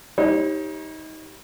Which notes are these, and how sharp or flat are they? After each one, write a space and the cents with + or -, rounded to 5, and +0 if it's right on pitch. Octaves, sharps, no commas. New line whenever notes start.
G3 +0 D#4 +25 C#5 -35